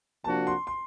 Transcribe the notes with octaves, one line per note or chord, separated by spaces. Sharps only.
C3 F3 A#3 D4 F#4 A5
C6
C6